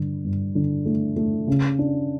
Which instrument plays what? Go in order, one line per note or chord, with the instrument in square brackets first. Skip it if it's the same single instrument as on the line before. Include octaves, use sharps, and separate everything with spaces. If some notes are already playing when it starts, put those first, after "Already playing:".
Already playing: [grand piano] G2 D3
G2
D3
A3
A3
C#3
D4